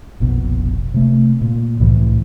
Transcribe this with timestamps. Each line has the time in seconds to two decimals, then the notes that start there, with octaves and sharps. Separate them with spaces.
0.20 F1 A#1 B2
0.94 C3 A3
1.41 A#2
1.80 C2 A2 E3